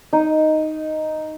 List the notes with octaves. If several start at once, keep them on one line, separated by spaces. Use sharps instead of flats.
D#4